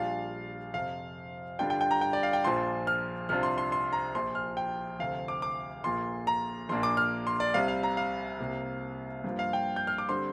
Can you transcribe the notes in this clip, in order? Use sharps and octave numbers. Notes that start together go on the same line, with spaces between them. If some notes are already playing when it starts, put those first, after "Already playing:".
Already playing: A#1 A#2 G3 D4 F4 F5
F2 C3 F3 F5
G2 D3 G3 D4 F4 G5
G5
G5
A#5
G5
D5
F5
G5
A#1 A#2 F3 D4 F4 C6
F6
C2 C3 F3 D4 F4 F6
C6
C6
C6
A#5
A#1 A#2 F3 C6
F6
G5
D2 C3 F3 F5
D6
D6
A#1 A#2 A#3 F4 C6
A#5
A#1 A#2 A#3 D4 C6
D6
F6
C6
D5
C2 C3 G3 F5
F5
A#5
F5
C2 C3 A#3
G2 F3 A#3 F4
F5
G5
G6
F6
D6
D3 G3 C4 C6